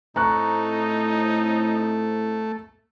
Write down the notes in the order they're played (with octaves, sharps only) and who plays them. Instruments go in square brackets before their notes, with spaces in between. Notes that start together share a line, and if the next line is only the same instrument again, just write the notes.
[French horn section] A2 C4 [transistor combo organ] A3 [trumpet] D#4 [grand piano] A#5 C#6 F#6